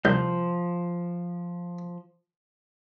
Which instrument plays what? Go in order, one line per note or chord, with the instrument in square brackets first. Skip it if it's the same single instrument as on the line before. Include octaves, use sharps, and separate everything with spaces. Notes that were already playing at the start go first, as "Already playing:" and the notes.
[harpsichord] C2 [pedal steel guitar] F3 G6